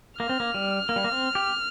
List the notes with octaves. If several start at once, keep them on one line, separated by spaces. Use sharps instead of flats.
A#3 F6
C4
A#3
G3
A#3
G3
A#3
C4
G4